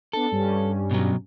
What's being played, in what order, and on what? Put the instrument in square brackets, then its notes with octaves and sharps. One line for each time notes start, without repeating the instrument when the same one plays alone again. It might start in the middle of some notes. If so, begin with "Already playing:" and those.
[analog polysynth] B3 D4 [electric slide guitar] A4
[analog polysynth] G2 G3 C#4
[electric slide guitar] B2 F#3